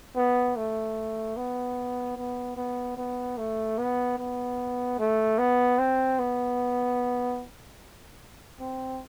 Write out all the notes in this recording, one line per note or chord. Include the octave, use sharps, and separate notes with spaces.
B3
A3
B3
B3
B3
B3
A3
B3
B3
A3
B3
C4
B3
C4